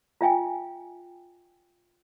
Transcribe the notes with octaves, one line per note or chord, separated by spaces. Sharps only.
F4 E5 G5 G#5